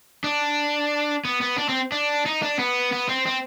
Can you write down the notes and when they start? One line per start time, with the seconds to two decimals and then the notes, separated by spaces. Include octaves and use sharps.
0.24 D4
1.25 B3
1.41 B3
1.58 D4
1.70 C4
1.92 D4
2.26 D#4
2.42 D4
2.59 B3
2.93 B3
3.10 C4
3.27 C4